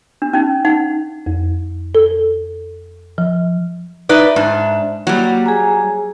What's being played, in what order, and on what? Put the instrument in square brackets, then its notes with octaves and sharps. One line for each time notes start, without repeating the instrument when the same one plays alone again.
[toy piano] D4
C#4 D#4
D#4 F#5
[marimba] F2
A4
F3
[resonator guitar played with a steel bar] D#4 B4 D5 [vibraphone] E5
[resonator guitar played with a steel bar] G#2 D4
[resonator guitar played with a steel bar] F#3 G3 [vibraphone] A#3
[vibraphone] G#4 G#5 A#5